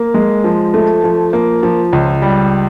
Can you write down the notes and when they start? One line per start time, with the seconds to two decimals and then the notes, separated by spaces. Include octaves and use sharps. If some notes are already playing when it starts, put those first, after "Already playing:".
Already playing: A#3
0.14 G#3
0.44 F3
0.74 A3
1.04 F3
1.33 A#3
1.63 F3
1.93 C#2
2.22 G3